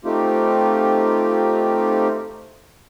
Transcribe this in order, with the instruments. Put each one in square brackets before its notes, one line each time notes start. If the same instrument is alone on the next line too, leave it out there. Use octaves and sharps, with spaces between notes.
[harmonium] A3 C4 D#4 F4 G4